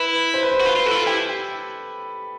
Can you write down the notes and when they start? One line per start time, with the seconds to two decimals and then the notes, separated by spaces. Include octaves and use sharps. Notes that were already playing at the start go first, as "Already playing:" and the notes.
Already playing: E4 B4
0.34 C5
0.43 B4
0.51 C5
0.61 F#4
0.66 F4 B4
0.76 F4
0.86 F#4 A4
0.91 E4
0.95 F4
1.06 E4 G4